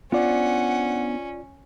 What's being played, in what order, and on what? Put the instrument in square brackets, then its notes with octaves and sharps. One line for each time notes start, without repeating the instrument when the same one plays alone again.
[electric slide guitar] B3 D4 C5 [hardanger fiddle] C#4 [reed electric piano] F4 D5 [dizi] F#5